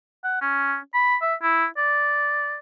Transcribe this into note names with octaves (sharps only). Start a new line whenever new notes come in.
F#5
C#4
B5
E5
E4
D5